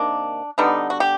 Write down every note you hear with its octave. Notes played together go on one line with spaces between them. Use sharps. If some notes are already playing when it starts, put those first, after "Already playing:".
Already playing: C3 D#3 A#3 D4
D3 G3 B3 D#4
F#4
G4